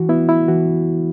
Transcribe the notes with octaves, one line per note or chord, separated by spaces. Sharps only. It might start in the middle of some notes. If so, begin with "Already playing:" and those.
Already playing: E3 F#4
B3 E4
E4
E3 F#4